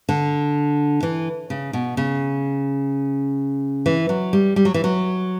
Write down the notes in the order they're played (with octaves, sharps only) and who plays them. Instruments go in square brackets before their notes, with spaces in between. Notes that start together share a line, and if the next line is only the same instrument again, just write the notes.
[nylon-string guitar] D3
E3
C#3
B2
C#3
E3
F#3
G3
G3
F#3
E3
F#3